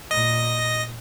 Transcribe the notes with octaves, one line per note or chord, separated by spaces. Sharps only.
A#2 D#5 A#6